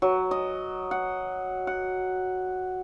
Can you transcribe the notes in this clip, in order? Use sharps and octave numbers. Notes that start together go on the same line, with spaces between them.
F#3
D#5
F#5
F#5